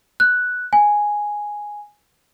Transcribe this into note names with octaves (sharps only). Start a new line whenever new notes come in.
F#6
G#5